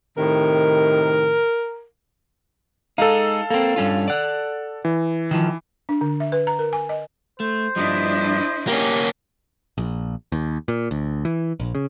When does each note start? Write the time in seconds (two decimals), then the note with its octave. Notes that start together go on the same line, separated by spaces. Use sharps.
0.17 A2 C3 D#3 A#4
2.98 G#3 D#4 A4 F5
3.50 A#3 C4 A4
3.76 G2 C#4 F4
4.08 D5 F#5
4.85 E3
5.31 D#3 F3
5.89 D4
6.01 D3
6.20 E5
6.32 B4
6.47 A#5
6.59 A#4
6.73 G#5
6.89 D#5
7.40 A3 C5
7.76 G2 F3 G3 D4 E4 D#5
8.67 A#3 C#4 G4
9.78 A#1
10.32 D#2
10.68 A#2
10.91 D2
11.25 E3
11.60 A#1
11.75 C#3